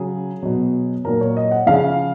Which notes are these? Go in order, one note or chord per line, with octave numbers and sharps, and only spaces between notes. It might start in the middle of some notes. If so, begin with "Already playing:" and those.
Already playing: C#3 F#3 G#4
B2 F#3
A#2 F#3 A#4
C#5
D#5
F#5
C#3 F3 F5